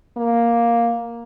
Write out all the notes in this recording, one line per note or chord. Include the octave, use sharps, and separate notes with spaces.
A#3